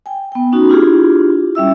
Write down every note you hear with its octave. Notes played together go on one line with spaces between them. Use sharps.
G5 G#5
B3 G5
C#4 D#4 F#4
D4 E4 F4 G4 G#4
G3 C#4 E5 E6